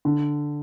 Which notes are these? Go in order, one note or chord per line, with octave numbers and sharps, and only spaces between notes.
D3